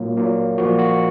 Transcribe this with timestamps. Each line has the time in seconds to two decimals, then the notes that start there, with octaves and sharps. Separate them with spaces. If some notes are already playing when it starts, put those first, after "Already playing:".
Already playing: A#2 F#3 A#3
0.17 A#2 F#3 A#3
0.58 A#2 F3 A#3 F#4
0.79 F#4